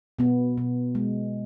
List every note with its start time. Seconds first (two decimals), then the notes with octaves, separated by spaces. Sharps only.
0.19 B2 B3
0.58 B2
0.95 G#3